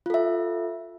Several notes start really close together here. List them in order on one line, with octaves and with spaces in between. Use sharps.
F4 A4 E5